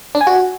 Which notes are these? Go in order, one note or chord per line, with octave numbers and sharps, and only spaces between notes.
D4
G#5
F#4